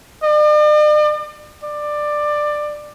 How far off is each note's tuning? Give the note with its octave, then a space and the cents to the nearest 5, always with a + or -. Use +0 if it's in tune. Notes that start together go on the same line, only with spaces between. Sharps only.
D5 +45
D5 +15